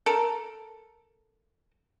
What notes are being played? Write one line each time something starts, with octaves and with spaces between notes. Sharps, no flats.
A4 A#4